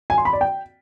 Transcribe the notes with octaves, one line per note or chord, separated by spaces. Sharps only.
G#5
C6
B5
D5
G5